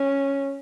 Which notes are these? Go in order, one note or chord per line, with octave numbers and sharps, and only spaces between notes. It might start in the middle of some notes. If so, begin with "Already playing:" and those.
Already playing: C#4